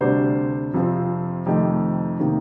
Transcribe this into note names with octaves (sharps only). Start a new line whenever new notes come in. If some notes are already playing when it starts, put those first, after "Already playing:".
D2 C3 G3 D4 C5
F2 C3 F3 C4
F2 C3 D#3 A3 D#4 G4
C3 D#3 A#3 D#4